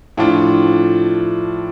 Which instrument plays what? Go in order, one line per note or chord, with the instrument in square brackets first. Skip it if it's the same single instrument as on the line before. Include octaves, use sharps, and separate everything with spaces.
[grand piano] A2 F3 D4 F4